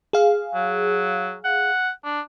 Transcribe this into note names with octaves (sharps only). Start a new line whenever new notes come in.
G#4 F5
F#3
F#5
D4